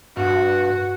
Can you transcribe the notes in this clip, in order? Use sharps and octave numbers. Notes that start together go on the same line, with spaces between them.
G2 F#4